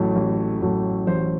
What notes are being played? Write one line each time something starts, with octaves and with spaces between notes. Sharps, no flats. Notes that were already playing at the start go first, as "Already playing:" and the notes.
Already playing: A1 A2 F#3 A3
A1
A2 F#3 A3
A1 C5